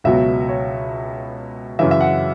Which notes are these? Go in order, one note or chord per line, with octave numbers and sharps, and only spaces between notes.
C#2 B2 F#3 E5
C#5
F#2 C#3 E3 E5
E5
F#5